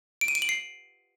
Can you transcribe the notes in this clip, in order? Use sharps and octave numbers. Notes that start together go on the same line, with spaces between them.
D7
D#7
D7
F#7
C7